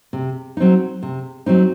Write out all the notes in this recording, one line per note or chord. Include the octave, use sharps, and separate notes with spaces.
C3
F#3 C4 D#4
C3
F#3 C4 D#4